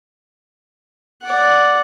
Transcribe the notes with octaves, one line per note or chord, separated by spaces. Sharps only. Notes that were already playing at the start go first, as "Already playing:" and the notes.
D5 F#5